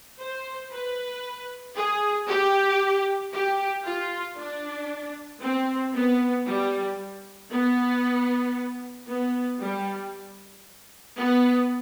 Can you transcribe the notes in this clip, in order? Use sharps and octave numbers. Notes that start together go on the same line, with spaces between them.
C5
B4
G#4
G4
G4
F4
D4
C4
B3
G3
B3
B3
G3
B3